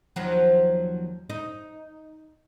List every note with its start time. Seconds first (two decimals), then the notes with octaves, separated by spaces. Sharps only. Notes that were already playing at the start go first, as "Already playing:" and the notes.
0.16 D#2 F3 F#3
1.30 D#4